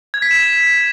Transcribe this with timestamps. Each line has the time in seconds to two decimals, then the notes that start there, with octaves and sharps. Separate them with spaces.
0.14 G#6
0.22 B6
0.31 E7